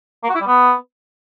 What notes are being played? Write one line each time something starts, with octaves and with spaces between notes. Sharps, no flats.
A#3
F#4
E4
G3
B3